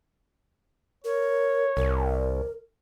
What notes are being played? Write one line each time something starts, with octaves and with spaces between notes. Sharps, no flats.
A#4 C#5
C2 A#4